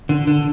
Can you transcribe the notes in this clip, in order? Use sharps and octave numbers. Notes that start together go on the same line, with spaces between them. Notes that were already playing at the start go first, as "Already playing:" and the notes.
D3
D3